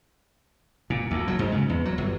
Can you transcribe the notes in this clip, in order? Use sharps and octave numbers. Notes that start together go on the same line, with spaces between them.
A#2
D2
F#3
G#2
C#3
E2
F#3
G1